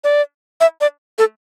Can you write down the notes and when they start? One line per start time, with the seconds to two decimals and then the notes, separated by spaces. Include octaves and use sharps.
0.04 D5
0.61 E5
0.81 D5
1.18 A4